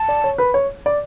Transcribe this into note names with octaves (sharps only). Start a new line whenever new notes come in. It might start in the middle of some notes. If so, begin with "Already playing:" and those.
Already playing: A5
D5
C#5
B4
C#5
D5